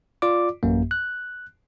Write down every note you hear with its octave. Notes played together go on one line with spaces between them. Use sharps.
F4 D5 D6
A1 F#2 A#3
F#6